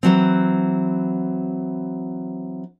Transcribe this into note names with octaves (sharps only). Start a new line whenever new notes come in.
E3 F#3 C4